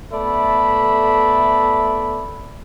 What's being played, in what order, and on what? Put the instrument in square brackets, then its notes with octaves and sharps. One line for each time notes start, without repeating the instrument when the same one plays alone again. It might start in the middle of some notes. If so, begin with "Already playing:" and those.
[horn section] A3 B3 A4 D5 E5 B5